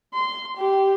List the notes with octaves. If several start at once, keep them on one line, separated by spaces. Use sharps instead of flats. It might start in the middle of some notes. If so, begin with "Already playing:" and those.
C6
G4